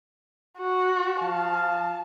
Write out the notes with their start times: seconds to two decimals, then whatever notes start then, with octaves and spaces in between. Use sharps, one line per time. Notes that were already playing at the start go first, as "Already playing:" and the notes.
0.58 F#4
1.21 F3 F5 A5